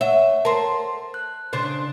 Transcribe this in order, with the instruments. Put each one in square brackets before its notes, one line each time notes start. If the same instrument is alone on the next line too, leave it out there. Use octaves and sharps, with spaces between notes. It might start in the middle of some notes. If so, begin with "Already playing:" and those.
[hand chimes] C#5 F#5 [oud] E5
[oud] A#4 C5 [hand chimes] A5
[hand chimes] F#6
[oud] C#3 D4 C5